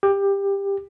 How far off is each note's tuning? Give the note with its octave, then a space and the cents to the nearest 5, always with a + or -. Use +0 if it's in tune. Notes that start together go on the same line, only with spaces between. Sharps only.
G4 +20